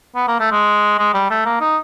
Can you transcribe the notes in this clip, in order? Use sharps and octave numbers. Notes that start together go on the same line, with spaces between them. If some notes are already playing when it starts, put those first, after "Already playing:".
B3
A#3
A3
G#3
G#3
G3
A3
A#3
D#4